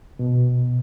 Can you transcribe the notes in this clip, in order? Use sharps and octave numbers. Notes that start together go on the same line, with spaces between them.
B2